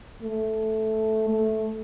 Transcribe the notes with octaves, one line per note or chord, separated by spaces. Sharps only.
A3
A3